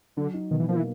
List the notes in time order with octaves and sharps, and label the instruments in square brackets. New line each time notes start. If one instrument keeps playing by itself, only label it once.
[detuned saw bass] D3 [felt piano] F#3
[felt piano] D#4
[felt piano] B2 [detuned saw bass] D#3
[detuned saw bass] E3
[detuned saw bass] F3 [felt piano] A#3
[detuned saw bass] E3